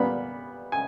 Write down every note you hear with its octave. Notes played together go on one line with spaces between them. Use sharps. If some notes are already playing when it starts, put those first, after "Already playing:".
Already playing: A#2 G3 B3 B5
G#5